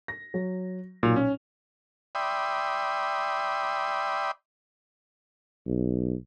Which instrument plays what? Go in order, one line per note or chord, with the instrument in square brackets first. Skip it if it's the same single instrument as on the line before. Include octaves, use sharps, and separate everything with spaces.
[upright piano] A#6
F#3
[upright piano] B1 F#3 F7 [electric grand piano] A#2
[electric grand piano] C#4 [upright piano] C#5
[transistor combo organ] D5 E5 G5 B5 C6 D#6
[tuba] B1